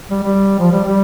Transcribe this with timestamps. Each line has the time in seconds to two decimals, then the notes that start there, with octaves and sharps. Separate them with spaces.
0.10 G3
0.23 G3
0.59 F3
0.72 G3
0.84 G3